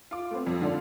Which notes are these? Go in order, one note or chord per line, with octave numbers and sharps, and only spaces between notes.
F4 D6
A3 B3 C4
F2
G#2 D3 F4 A4 D5 F5